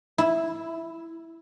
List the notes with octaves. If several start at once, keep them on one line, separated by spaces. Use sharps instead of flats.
E4